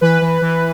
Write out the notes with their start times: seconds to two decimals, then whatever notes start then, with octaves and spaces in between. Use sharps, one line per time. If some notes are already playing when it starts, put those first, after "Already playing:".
0.01 E3 B4
0.22 E3
0.42 E3